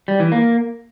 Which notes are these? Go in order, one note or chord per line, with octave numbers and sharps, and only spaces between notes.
G3
E3
A#3